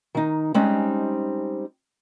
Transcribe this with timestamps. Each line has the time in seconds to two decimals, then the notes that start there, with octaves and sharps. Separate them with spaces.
0.15 D#3 D#4
0.54 G3 G#3 C4 C#4 D#4